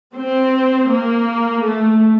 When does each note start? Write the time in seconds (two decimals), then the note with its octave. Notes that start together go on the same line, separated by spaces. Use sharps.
0.17 C4
0.91 A#3
1.65 A3